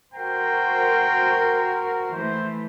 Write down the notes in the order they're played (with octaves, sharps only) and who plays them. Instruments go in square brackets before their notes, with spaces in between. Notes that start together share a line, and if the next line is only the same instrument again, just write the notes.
[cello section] F#4 A#4 C5 [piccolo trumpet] G5
[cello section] E3 A3 [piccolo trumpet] C5